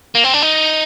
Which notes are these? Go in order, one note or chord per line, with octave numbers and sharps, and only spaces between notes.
A#3
C4
D4
D#4